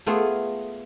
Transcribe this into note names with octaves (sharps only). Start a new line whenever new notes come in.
A3 B3 F4 G#4